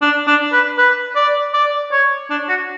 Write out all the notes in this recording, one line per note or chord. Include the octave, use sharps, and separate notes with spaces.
D4
D4
B4
B4
D5
D5
C#5
D4
F#4